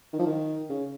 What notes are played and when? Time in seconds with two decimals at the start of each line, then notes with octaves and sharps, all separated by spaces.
0.13 D#3
0.19 F3
0.26 D#3
0.69 C#3